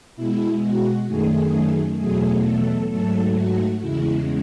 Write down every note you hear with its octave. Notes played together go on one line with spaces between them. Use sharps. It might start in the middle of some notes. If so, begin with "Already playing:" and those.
B2 G#3 E4
F#4
F#2 D#3 A3 G#4
E2 B2 F#3 A3 G#4
A4
G#2 F#3 A3 A4
F#4
E2 C#3 G#3 E4